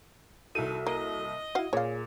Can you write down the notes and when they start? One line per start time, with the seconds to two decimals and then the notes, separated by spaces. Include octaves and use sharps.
0.55 C2 D#3 D#4 E4 F#4 A4 D#7
0.87 A#3 D#5
1.55 E4 F#4 F5 F#5
1.73 A#2 G#4 C#5 F5